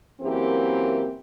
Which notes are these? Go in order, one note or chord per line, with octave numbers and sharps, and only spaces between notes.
F#2 E3 A#3 C4 G4